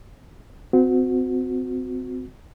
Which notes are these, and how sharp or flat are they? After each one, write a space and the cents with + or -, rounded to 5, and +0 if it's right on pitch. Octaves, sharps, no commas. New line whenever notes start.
C4 -30 F#4 -20